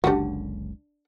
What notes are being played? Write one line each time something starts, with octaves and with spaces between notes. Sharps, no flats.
F#1 C#2 D3 D4 F#4 G4 F#5